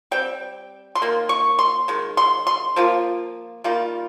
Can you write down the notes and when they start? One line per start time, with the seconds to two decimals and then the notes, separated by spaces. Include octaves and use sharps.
0.11 G3 C4 G5
0.95 C6
1.02 D#3 A#3
1.29 C#6
1.59 C6
1.88 D#3 G#3
2.17 C6
2.47 C6
2.76 F3 A#3 F4
3.64 D#3 G3 A#3 F4